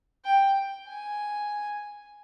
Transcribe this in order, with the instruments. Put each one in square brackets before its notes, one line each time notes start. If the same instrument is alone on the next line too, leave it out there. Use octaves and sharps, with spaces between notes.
[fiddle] G5
G#5